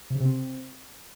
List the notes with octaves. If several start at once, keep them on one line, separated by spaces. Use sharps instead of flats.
C3
C#3
C3
C4